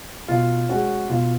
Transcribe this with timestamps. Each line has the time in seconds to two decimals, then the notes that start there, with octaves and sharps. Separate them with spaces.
0.28 B2 F4
0.69 G#3 C#4 F#4
1.09 B2 F4